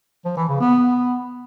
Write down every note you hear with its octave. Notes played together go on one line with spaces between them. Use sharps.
F3
E3
C#3
B3